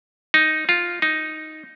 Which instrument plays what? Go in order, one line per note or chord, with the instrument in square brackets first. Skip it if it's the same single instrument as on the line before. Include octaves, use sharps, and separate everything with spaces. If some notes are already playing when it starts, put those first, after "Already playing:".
[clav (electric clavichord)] D#4
F4
D#4